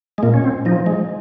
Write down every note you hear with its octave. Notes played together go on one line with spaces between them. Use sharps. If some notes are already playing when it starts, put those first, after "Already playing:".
G#3
A#2 A#3
C#4
C4
F3 D#4
G#3